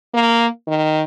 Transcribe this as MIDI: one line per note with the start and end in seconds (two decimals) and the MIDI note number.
0.14 0.47 58
0.68 1.03 51